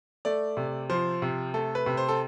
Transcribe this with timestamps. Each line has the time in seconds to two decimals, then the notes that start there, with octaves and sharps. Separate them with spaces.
0.25 A3 D5
0.57 C3
0.90 F3 C5
1.22 C3
1.54 A3 A4
1.75 B4
1.86 C3
1.97 C5
2.08 A4